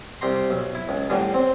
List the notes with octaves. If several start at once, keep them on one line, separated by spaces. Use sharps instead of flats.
C2 G4 A#5 C6
B1
E4
C#2
E2 A2 D3 E3 G3
C4